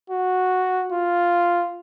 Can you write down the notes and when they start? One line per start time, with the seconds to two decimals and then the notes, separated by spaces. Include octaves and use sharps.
0.10 F#4
0.93 F4